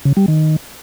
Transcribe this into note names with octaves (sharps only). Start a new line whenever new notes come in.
C#3
G3
D#3